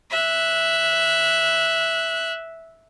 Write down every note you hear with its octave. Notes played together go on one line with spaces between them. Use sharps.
E5 F#6